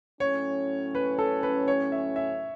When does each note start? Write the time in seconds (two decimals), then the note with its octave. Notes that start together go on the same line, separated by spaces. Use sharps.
0.20 A2 F#3 C#4 C#5
0.95 B4
1.19 A4
1.43 B4
1.68 C#5
1.92 E5
2.16 E5